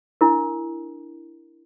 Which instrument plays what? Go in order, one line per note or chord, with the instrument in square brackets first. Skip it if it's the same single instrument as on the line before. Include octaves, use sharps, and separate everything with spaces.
[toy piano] D4 E4 A#4